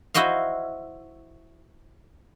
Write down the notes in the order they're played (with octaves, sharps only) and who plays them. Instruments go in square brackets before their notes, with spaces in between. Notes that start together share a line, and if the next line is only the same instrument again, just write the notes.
[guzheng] E4 F#4 C5 D#5 F5